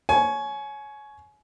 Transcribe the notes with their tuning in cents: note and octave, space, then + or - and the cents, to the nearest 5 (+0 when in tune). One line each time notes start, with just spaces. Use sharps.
C#5 +0 G#5 +30